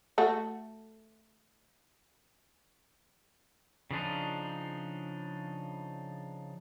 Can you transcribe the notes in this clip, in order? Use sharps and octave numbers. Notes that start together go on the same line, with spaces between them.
A3 F#4
C#3 F3 D4 D#4